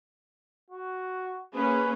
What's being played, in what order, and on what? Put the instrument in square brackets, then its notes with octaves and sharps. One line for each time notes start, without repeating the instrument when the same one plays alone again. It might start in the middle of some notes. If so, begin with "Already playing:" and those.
[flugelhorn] F#4
[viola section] A#3 C#4 G#4 [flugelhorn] B4